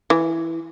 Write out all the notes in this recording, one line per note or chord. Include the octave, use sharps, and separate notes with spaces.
E3